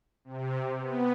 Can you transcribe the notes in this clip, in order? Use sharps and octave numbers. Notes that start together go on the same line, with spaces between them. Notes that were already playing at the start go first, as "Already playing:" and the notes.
C3
B3